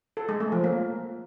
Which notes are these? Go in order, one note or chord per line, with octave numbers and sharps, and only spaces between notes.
A4
G#3
A3
F3
A#3